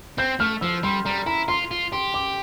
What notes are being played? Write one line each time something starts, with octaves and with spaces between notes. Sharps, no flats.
C4 G6
A3 F6
F3 E6
G3 C6
G3 A#5
E4 A#5
F4 C6
F4
G4 C6
D6